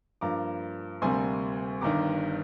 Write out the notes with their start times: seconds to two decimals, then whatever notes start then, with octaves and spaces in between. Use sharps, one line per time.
0.21 G2 F3 A#3 A#5 D6
1.02 D2 C3 G3 A#3 G#5 C6
1.81 G1 G2 D#3 A#5 D6